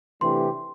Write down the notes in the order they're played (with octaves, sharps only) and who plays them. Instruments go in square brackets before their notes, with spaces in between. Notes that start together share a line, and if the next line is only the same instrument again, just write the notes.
[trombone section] C3 E3 A3 D4 G4 [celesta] C6